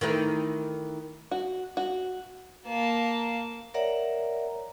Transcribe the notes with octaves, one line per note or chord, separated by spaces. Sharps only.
D#3 E3 A3
F#4
F#4
A#3 A5
A#4 C#5 D5 E5 F#5 A#5